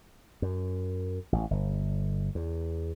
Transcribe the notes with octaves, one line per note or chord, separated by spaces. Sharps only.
F#2
A1
G1
E2